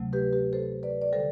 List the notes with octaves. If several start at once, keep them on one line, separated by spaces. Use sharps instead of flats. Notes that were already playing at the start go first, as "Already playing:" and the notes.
Already playing: D2 C3 F#3 A3
G4 B4
G4 B4
A4 C5
B4 D5
D5
D3 G3 A4 C5